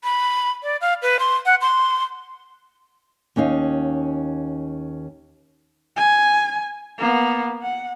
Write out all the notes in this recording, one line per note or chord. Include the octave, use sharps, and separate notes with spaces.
B5
D5
F5
B4
C6
F#5
C6
D#2 C#4 D#4 F5
G#5
A#3 B3
F#5